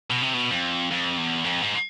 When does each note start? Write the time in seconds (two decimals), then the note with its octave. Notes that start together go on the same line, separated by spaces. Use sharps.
0.10 B2
0.22 C3
0.34 B2
0.50 F2
0.91 F2
1.17 E2
1.44 F2
1.62 G#2